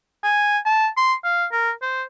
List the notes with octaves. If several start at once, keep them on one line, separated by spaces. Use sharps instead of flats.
G#5
A5
C6
F5
A#4
C5